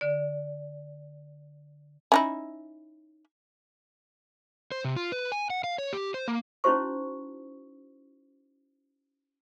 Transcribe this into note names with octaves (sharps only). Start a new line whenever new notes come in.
D3 D5
C#4 D#4 E4
C5
C3
F4
B4
G#5
F#5
F5
C#5
G4
C5
A#3
C#4 D#4 E4 F#4 C5 C#6